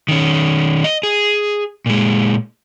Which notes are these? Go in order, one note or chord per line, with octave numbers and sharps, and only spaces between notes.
D#3 C#4
D#5
G#4
A#2 G#3